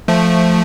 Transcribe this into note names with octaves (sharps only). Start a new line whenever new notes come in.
F3 A3